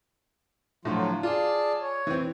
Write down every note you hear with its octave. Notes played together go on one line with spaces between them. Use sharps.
A2 D3 F3 F#3 A3 F4
F4 G#4 D5 A5
C#5
E3 C4